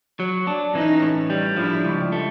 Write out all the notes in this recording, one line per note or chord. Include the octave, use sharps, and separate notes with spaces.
F#3
D4
E3 C#4 D#4
A2
G3
F3 D4 E4
C#2
A3